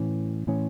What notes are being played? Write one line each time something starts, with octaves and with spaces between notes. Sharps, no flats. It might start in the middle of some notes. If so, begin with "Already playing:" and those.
Already playing: A2 E3 C#4
A2 E3 C#4